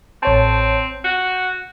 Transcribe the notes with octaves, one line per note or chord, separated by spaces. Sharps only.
A1 C4 C#5 A5
F#4 G6 C#7